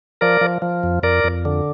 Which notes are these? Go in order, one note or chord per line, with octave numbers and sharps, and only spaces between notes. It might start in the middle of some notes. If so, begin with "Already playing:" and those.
F3 A#4 D5
F3
F3
F2
F2 A#4 D5
F2
D3